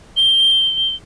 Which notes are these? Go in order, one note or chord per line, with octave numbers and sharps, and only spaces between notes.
G7